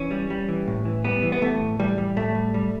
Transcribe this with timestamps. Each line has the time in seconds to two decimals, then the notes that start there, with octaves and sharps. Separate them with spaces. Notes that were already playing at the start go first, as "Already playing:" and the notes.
Already playing: E3 C#4
0.11 G3
0.30 G3
0.49 E3
0.68 A2
0.85 E3
1.04 G3 B3
1.23 E3
1.32 B3
1.42 E3 A3
1.61 A2
1.80 E3 G3
1.98 G3
2.16 A2 A3
2.35 G3
2.54 G3